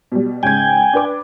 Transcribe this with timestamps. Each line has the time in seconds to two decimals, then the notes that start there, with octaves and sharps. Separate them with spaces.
0.12 B2 G3
0.43 G#2 C#3 G5 G#5 G#6
0.93 D4 B4 D6